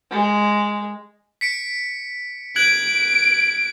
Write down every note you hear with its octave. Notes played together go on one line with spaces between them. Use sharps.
G#3
B6 C#7 D7
F#6 G#6 D7 F#7